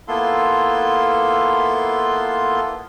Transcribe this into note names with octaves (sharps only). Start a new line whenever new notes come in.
A#3 B3 E4 F4 A4 C6